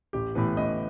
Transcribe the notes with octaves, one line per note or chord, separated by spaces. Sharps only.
A1 G4
A2 E3 B3 B4
A1 D#5